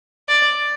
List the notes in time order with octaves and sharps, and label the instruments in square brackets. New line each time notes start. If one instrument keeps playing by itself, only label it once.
[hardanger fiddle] D5